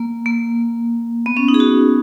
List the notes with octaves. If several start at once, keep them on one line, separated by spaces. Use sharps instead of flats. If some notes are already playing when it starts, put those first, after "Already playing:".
Already playing: A#3
A#3
B3
C#4
D#4
G#4
F#4